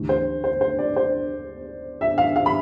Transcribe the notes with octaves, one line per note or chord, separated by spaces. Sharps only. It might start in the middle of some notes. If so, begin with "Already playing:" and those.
Already playing: D2 C3 E3
C5
C5
C5
D5
C5
E5
F5
F5
B5